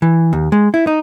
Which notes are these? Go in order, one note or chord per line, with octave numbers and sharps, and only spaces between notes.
E3
D#2
G#3
E4
D#4